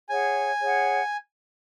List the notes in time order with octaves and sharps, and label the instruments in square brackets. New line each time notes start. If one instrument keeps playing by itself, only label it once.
[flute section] G#4 C#5 F#5 [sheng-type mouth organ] G#5
[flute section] G#4 C#5 F#5